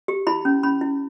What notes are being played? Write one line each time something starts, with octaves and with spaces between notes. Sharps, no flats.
G4
E4 B5
C#4
C#4 B5
E4